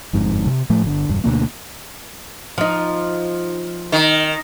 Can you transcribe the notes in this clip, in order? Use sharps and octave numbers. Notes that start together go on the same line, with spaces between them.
G1 F2 G#2
C3
A2 F3 A3
G1 D3
E1 G2
D2 B2 G#3 A#3
F3 D#4
D#3